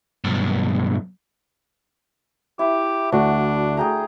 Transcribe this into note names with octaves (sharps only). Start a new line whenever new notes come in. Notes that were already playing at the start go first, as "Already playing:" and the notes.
B1 G2
E4 G4
D2 D4 F#4
G#4 G5 A#5